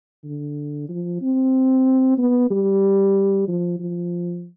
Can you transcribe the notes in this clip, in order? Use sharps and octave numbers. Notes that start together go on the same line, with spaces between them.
D3
F3
C4
B3
G3
F3
F3